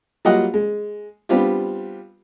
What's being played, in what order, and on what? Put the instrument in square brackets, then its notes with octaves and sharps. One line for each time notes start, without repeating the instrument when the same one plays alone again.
[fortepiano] F#3 G3 A#3 F4 D#5 F#5
G#3
G3 B3 C4 D4 F4 G4